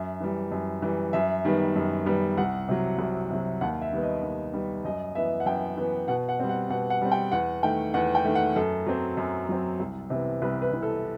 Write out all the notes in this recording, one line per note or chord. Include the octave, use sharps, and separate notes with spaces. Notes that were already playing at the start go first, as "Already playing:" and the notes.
Already playing: F#2 E5
E3 G3
F#2
E3 G3
F#2 E5
D#3 G3 B3
F#2
D#3 G3 B3
C2 F#5
C3 F#3
C2
C3 F#3
D#2 F#5
E5
D#3 G3 B3
D#5
D#2
D#3 G3 B3
F#2 D#5
E3 B3 E5
F#5
F#2 G5
E3 B3
B2 F#5
F#5
G3 C4
F#5
B2 F#5
F#5
G3 C4
G5
E2 F#5
D#3 A3 G5
E2 F#5
G5
D#3 A3
F#5
F#2 A4
F#3 C4
F#2
F#3 C4
C2
C3 E3 B3
C2 B4
B4
C3 E3 B3
A4